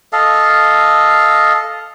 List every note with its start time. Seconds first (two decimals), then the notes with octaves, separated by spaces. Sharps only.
0.13 A4 D#5 F5